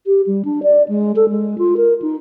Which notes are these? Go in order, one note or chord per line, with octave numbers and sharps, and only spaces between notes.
G4
G3
D4
D5
G#3
A4
G#3
F4
A#4
D#4